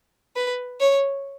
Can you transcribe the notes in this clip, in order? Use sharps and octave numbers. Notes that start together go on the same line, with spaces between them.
B4
C#5